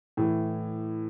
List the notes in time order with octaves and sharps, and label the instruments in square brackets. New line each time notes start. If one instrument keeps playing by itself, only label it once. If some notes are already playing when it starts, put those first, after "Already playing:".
[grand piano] A2 E3